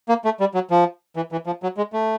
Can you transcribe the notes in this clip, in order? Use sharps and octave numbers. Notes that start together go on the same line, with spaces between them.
A#3
A3
G3
F#3
F3
E3
E3
F3
F#3
G#3
A3